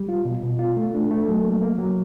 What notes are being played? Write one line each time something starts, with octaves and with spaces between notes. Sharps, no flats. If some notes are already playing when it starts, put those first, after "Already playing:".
Already playing: G3
F4
B2
B2
F4
A3
D4
A3
F#3
A#3
A#3
F#3